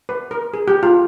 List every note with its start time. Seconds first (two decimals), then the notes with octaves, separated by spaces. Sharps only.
0.09 B4
0.31 A#4
0.54 G#4
0.68 G4
0.83 F4